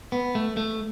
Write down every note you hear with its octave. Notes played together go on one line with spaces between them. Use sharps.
B3
A3
A3